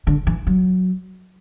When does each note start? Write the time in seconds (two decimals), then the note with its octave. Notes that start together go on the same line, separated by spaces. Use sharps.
0.07 D3
0.27 E3
0.47 F#3